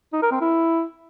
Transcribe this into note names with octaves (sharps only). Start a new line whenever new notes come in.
D#4
A#4
C4
E4